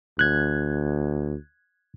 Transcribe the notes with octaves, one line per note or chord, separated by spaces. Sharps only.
D2 F#6 G#6